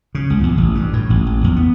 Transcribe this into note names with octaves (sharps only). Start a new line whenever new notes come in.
C#3
C#2
E2
A1
G2
A2
A1
A1
E2
B3